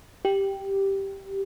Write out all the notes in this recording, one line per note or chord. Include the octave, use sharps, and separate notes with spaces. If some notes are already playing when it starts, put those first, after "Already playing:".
G4